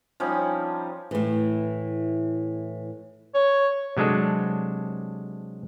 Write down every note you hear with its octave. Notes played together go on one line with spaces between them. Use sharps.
F3 G3 C#4 D#4
A2 E3
C#5
C3 F#3 G#3 D4 A4